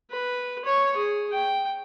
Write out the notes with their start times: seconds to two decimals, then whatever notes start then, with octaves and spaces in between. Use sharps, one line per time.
0.11 B4
0.65 C#5 C#6
0.96 G#4
1.32 G5